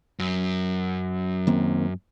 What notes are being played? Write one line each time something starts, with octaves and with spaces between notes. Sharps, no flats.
F#2
D#3 A#3 C4